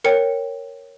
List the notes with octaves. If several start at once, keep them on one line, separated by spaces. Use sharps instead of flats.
A#4 C#5 G5 C#7